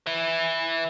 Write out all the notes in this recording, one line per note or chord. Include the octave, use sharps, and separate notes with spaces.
B4 E5